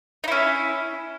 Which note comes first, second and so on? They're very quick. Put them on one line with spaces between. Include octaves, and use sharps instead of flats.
D#4 E4 C#4